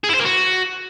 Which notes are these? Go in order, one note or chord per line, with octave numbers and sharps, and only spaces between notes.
G#4
E4
C5
A#3
F#4